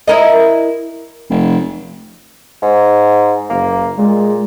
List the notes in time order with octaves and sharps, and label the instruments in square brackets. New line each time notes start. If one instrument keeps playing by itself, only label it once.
[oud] E4 A#4 D#5
[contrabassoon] F1
[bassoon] G#2
[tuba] F#1 [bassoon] A#3
[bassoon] A#2 [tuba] G#3